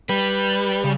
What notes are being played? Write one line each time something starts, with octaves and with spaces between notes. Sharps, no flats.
G3 B4
C#3